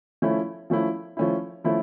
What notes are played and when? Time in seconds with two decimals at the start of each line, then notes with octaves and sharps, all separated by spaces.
0.22 F3 A3 C#4 E4
0.70 F3 A3 C#4 E4
1.17 F3 A3 C#4 E4
1.64 F3 A3 C#4 E4